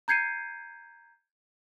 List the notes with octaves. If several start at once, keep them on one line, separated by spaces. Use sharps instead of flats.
A#5 G6 G#6 C7 C#7 D#7